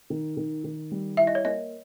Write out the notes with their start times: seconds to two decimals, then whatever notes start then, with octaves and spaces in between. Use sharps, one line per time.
0.10 D#3
0.37 D#3
0.64 D#3
0.91 G3
1.17 E4 E5
1.27 D#5
1.35 C#5
1.44 A#3 D#5